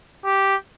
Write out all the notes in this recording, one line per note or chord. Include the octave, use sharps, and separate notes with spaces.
G4